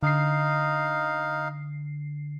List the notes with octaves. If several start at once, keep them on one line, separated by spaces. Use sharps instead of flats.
D3 D#4 F5 C7